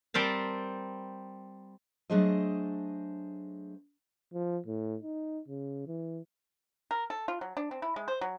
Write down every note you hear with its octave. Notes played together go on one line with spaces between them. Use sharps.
G3 C4 A#4 A5
F#3 A3 D4 G#4 C5 D#5
F3
A2
D#4
C#3
E3
A#4
A4
F4
F#3
D4
C4
E4
G#3
C5
F#3